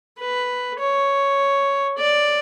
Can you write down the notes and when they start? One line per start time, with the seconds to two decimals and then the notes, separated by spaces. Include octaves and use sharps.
0.19 B4
0.80 C#5
1.98 D5